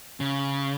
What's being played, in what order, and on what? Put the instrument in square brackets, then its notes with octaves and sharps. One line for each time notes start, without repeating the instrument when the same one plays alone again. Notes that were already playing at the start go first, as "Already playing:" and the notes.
[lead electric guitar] C#3